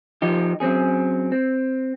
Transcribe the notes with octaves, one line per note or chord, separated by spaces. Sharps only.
F3 D#4 G4
F#3 C4 C#4 G#4
C4